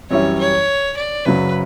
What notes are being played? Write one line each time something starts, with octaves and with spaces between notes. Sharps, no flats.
F#2 E3 G3 C#4 E4 C#5
C#5
D5
F#1 F#2 C#3 F#3 B4